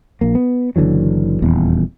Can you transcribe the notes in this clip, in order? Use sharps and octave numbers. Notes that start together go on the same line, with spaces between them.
A#1 A#3
B3
F#1 D3 E3 F#3
D#1 E2